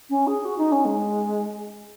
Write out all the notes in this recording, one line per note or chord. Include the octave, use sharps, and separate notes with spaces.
C#4
G#4
F#4
D#4
C#4
G#3